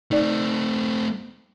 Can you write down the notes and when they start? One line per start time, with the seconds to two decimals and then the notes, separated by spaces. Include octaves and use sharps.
0.11 A3 C4 D#4 D5